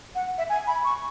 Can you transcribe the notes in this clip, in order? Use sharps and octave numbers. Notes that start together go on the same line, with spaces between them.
F#5
E5
G#5
B5
C#6